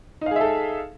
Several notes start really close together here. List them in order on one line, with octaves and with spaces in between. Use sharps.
D#4 F5 G#4 E5 A4